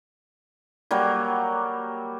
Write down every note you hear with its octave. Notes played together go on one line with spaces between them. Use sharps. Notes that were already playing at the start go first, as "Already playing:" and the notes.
F#3 G3 A#3